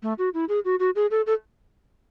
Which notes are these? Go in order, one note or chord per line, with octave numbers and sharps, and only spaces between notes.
A3
F#4
E4
G#4
F#4
F#4
G#4
A4
A4